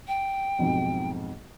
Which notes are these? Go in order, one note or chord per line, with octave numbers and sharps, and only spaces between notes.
G5
B1 F2 G#2